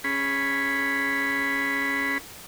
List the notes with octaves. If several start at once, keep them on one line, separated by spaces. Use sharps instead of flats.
C#4 G#4 B5